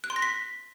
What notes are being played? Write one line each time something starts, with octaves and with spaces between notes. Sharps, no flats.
F#6
C6
A#6
B6